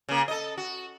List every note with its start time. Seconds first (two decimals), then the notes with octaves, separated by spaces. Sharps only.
0.09 C#3 A#3
0.28 A4 D#5
0.57 F#4